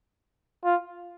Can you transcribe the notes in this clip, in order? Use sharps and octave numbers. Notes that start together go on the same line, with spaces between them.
F4